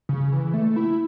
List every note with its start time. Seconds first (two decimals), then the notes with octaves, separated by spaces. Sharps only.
0.09 C#3
0.32 E3
0.54 A3
0.76 E4